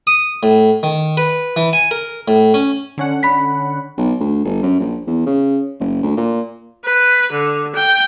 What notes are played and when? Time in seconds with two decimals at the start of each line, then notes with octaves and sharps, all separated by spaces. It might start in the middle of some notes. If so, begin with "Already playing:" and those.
0.07 D#6
0.43 A2
0.83 D#3
1.17 B4
1.56 E3
1.73 G#5
1.91 A#4
2.28 A2
2.54 C#4
2.98 D3 C#4 F#5
3.23 B5 B6
3.98 B1
4.20 D2
4.45 G1
4.63 F#2
4.80 A#1
5.07 E2
5.26 C#3
5.80 F#1
6.03 D2
6.17 A#2
6.85 B4
7.32 D3
7.75 G5